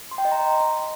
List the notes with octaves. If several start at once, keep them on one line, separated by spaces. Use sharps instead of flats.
C6
G5
D#5
A#5